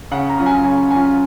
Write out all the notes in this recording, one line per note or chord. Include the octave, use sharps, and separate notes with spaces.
C#3 F#5
A#5
F#3 C#4 F4
G#5
C#3 G#5
F#3 C#4 F4 G#5